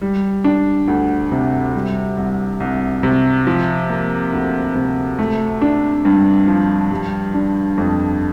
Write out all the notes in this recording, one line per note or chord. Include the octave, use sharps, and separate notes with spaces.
G3
D4
D2
C3
G3
C2
C2
C3
F3
A#3
D2
C3
A3
D4
G2
F3
G3
D4
F2